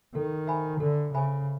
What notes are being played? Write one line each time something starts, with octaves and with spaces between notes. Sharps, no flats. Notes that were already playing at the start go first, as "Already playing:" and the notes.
D#3 A4
C5 E5 G#5 B5
D3 A4
C#3 C5 E5 G#5 B5